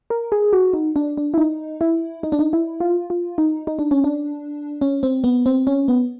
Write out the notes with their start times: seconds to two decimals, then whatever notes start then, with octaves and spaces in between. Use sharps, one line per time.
0.10 A#4
0.32 G#4
0.53 F#4
0.73 D#4
0.96 D4
1.17 D4
1.34 E4
1.38 D#4
1.81 E4
2.23 D#4
2.32 D4
2.39 D#4
2.53 E4
2.80 F4
3.10 F4
3.38 D#4
3.67 D#4
3.79 D4
3.91 C#4
4.04 D4
4.81 C#4
5.03 C4
5.24 B3
5.46 C4
5.67 C#4
5.88 B3